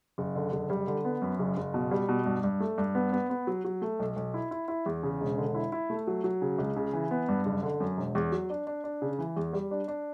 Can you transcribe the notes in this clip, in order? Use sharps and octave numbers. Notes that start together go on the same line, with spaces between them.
F#1
D3
F#1
G3
D3
B3
F#2
F#1
F#1
B2
G3
B2
G2
G2
A3
G2
B3
B3
B3
F#3
F#3
A3
B1
B1
E4
E4
E4
E2
C#3
E1
D3
E4
E4
A3
F#3
F#3
C#3
C#2
C#3
E3
B3
G2
F#1
D3
F#2
E1
E2
F#3
D4
D4
D4
C#3
E3
E2
G3
D4
D4